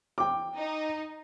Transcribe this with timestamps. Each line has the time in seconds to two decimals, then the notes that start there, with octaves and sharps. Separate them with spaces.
0.18 G5 D6
0.56 D#4